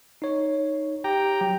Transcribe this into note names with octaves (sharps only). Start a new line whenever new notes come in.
D#4 C#5
G4 G5 A#5
F#3